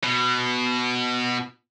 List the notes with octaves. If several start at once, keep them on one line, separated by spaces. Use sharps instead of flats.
B2